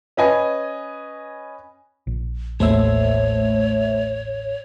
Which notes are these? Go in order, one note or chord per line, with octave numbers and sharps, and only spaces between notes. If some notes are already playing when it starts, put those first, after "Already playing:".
C#4 B4 D#5 G#5
A#1
A1 D#2 A3 A#3 C5 C#5 E5